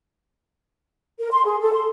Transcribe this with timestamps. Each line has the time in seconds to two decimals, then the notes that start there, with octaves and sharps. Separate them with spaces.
1.19 A#4
1.32 C6
1.45 G#4
1.61 A4
1.73 C6